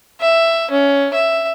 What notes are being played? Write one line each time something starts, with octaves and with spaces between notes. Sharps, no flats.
E5
C#4
E5